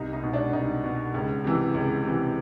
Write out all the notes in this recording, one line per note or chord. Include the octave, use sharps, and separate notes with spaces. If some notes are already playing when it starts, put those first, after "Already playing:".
Already playing: C2 D#4
D#4
B2
D4
C2 D#4
B2
C#2
C3 E3
C#2
C3 E3